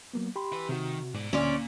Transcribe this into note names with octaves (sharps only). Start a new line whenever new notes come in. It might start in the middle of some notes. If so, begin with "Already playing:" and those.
F#3 A#3 B3
G4 B5 C6
E4 B4
C3 D#3 F#4
G#2 B2 D5
D2 A#2 D3 C#4 D5 C6